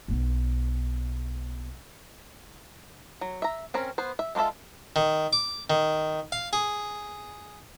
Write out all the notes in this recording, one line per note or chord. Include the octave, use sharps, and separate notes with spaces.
B1 B3
F#3
E5 A#5
C4 C#4 A#4
B3 C5
E5
G#3 A#3 F4 A4 E5
D#3
D6
D#3
F5
G#4